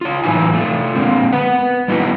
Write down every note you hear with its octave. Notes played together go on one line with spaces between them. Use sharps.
F4 C#5
A2 E3 F#3 D#4 G#5
A3 F4
D3 G#3 A#3 C4
B4 F#5
G3 B3 D#4 E4 F#4